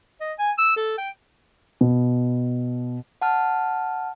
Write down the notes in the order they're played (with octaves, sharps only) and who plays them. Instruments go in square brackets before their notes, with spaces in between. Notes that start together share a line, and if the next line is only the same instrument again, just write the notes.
[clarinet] D#5
G#5
E6
A4
G5
[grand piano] B2
[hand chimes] F#5 A5 F6